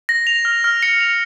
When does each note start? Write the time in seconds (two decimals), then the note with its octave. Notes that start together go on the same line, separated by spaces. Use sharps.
0.09 A#6
0.27 F7
0.45 F6
0.64 F6
0.83 C#7
1.01 F7